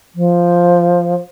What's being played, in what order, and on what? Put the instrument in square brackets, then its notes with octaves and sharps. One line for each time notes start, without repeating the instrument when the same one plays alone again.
[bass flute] F3